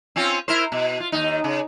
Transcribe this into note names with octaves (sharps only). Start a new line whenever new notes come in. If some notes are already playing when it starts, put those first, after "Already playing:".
C4 C#4 F4
E4 A#4 C5
B2
F4
D#2 D#4
C#3